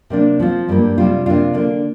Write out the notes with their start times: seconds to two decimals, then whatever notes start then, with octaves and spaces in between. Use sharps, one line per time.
0.10 C3 A#3 D4
0.40 F3 C4 F4
0.68 G2 G3 A#3
0.98 C3 G3 D4 F4
1.26 C3 A#3 D4 F4
1.54 D3 A#3 D4